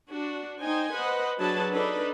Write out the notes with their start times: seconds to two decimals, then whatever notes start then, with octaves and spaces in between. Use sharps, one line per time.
0.10 D4 F#4
0.60 D#4 C5 D#5 G5 G#5
0.93 B4 C5 D#5 F#5
1.39 F#3 D4 G#4 B4 A5
1.72 D4 D#4 A4 B4